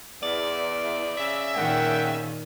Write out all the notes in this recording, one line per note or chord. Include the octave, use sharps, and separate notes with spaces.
E2 D5
C#3 E5
A#2 D#3 F#5 G5